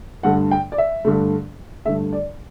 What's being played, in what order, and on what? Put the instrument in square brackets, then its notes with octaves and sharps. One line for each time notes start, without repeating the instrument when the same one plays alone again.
[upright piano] G2 D3 A3 F#5
G5
D5
E5
G2 D3 A3
G2 D3 A3 E5
D5